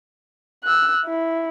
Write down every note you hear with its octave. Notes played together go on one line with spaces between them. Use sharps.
E6 F#6
E4